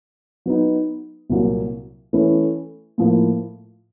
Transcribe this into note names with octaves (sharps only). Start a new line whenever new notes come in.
F#3 B3 D#4
C2 A#2 F#3 A#3
E3 A3 C#4 E4
A2 F3 A#3